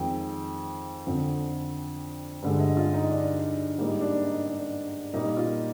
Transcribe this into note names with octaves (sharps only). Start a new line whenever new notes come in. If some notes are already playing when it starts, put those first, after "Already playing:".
Already playing: F2 D#3 G#3 G5
F2 D3 F3
G2 D3 G#3
D#5
F4
D#4
D4
G#2 G3 A#3 D#4
D4
D#4
D4
D4
A#2 G3 A#3 D#4
F4